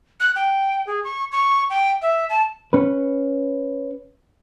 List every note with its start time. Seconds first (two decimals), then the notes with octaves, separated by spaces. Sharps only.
0.20 F#6
0.36 G5
0.87 G#4
1.04 C#6
1.32 C#6
1.70 G5
2.02 E5
2.30 A5
2.73 C#4 B4